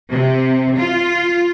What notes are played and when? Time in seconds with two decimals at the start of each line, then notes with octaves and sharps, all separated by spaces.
0.11 C3
0.77 F4